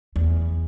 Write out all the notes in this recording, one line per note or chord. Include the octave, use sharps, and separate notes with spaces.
E2